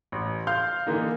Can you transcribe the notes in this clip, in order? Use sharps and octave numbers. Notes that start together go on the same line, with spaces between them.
A1
F5 C6 F6 G6
D3 E3 A#3 D#4